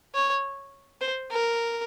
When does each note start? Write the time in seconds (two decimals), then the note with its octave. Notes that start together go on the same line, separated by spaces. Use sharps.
0.15 C#5
1.01 C5
1.31 A#4